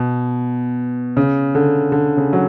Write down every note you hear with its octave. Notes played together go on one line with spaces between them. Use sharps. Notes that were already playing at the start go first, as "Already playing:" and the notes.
Already playing: B2
C#3
D3
D3
C#3
F#3